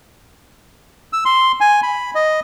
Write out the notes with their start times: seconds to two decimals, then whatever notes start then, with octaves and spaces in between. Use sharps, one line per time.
1.13 E6
1.25 C6
1.61 G#5
1.83 B5
2.15 D#5